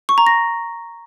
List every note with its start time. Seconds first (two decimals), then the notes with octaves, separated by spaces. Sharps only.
0.09 C#6
0.18 A#5
0.27 A#6